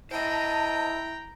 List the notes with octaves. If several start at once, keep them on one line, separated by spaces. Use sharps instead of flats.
E4 C5 D#5 G5 A5 A#5